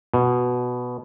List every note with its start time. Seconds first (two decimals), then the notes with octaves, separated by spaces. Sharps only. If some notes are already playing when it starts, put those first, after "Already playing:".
0.14 B2